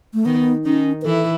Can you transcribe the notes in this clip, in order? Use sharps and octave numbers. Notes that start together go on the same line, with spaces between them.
A3
D#3 B3 D#4
D#3 C#4 D#4
B4
E3 E4 A4